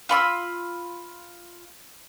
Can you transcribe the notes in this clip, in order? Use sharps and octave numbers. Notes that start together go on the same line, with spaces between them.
F4 B5 C#6 E6